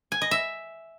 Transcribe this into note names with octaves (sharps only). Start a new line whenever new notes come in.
G#5
D#5
E5